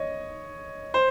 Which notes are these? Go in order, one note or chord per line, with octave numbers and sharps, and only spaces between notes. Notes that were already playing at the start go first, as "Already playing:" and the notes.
Already playing: C#5 D#5
C5